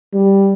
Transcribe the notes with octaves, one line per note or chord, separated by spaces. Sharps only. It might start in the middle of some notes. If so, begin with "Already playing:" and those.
G3